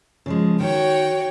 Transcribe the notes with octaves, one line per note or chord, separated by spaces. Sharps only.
C#3 F3 G#3
D#3 F#4 C#5 G5